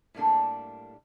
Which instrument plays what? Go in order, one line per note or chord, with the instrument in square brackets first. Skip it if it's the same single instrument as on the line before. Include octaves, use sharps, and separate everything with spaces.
[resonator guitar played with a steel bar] A2 G3 A#3 D4 A4